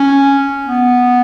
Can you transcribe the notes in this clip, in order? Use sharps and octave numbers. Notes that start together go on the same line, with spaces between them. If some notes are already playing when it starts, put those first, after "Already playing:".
Already playing: C#4
B3